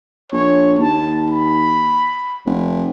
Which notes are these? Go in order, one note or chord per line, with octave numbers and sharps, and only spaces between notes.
A#1 C#5
D#2 A5
B5
F1